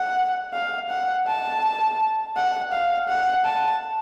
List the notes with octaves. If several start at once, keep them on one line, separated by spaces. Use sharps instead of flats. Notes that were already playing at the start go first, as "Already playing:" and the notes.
Already playing: F#5
F5
F#5
A5
F#5
F5
F#5
A5